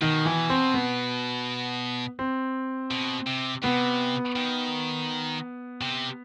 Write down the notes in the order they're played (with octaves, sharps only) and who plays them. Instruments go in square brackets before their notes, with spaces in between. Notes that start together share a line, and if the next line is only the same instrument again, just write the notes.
[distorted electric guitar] B2 [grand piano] D#3
[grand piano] E3
C4
B3
C4
[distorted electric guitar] B2
C3
[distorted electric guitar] C3 [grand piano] B3
[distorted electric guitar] D#3
C3